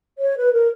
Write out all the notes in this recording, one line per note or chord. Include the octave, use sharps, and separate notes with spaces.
C#5
B4
A#4